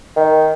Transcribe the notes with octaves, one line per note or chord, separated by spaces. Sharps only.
D#3